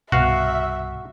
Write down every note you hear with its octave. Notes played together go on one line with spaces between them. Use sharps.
C2 G2 B2 F#4 E5 F5